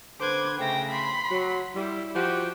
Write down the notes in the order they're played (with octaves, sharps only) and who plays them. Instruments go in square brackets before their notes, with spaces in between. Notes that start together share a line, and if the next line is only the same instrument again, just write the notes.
[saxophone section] D3 B4 C5 [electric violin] D6 G#6
[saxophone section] C#3 A3 [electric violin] G5 A#6
[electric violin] B5 C6
[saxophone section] F#3
[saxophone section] G3 [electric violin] E4
[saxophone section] F3 F#4 G4